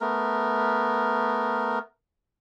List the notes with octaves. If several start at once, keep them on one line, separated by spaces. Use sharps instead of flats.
A3 B3 A#4